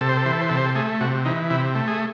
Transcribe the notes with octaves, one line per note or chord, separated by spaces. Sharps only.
C3 A4
C5
A4
E3 C5
A4
C5
C3 A4
C5
A4
A3 G#4
C3 F#4
E3 D#4
C3 E4
A3
G#4